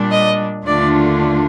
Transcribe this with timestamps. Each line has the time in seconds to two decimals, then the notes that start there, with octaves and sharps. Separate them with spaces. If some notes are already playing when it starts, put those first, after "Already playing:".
Already playing: A#2 G3 D4
0.10 D#5
0.66 D#2 D3 A3 D4 F4 D5